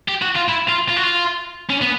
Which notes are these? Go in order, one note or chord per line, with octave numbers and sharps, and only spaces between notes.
G4
F#4
F4
E4
F4
F4
F#4
F4
C#4
B3